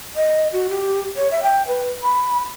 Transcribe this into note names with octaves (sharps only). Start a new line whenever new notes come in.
D#5
F#4
G4
C#5
E5
G5
B4
B5